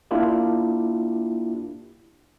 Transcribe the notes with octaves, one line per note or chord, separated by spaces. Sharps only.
A#3 D4 E4 F4 G4